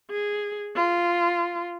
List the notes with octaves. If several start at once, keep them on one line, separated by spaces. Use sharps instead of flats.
G#4
F4